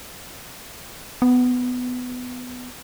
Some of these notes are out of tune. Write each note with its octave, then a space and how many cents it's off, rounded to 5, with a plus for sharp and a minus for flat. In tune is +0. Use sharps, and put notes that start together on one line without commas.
B3 +15